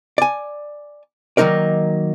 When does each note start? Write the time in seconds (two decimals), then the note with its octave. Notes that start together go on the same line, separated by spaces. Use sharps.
0.18 D5 G#5
1.37 D#3 F#3 A#3 D#4 A#4 D5